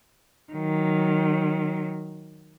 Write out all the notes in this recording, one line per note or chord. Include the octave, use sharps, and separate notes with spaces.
D#3 F#3